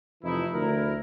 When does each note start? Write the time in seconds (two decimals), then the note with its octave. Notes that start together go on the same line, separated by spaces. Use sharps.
0.23 F2 C3 E3 A3 D#4 E4
0.53 D2 E4 A#4